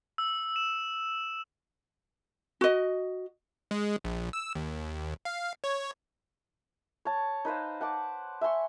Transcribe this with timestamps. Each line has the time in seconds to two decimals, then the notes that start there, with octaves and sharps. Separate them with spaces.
0.18 E6
0.56 E7
2.61 F#4 D#5
3.71 G#3
4.04 A#1
4.33 E6
4.55 D#2
5.25 F5
5.64 C#5
7.05 C#5 A5
7.45 D#4 B4 C5 F5
7.81 F#5 A5 D6
8.41 E5 G#5 C6 C#6